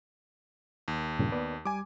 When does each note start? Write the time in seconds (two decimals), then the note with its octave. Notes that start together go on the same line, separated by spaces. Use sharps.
0.88 D#2
1.19 G2 A#2 C#3
1.32 B3 B4 D5
1.66 G3 G#5 D6